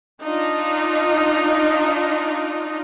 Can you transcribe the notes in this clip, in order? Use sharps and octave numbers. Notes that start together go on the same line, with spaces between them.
D4 D#4 F4